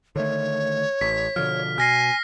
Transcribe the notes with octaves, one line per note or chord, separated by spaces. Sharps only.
D3 D#3 A3 C#5
A1 B6
B2 D3 F3 F6
B2 G#5 F6 A#6 C7